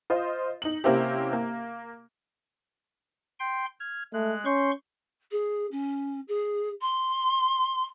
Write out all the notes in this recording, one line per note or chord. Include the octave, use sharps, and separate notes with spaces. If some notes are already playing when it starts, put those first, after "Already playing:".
F4 C5 D#5
D#4 F#7
C3 A#3 C4 C#4 E4 G4
A#3
G5 C6
F6 G#6
G#3 A3 F#6
C#4 C6 C#6 G6
G#4
C#4
G#4
C6